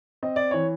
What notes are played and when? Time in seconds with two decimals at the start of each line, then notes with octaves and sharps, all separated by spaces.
0.23 C4 D#5
0.36 D5
0.51 E3 C#5